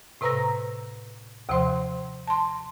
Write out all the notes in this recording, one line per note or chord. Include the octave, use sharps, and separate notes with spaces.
A2 C3 B4 A#5 E6 A#6
D#2 C3 F3 C5 C6
A5 C6